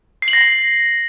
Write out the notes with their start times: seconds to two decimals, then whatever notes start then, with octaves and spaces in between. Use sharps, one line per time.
0.22 C7
0.28 F#7
0.33 A#6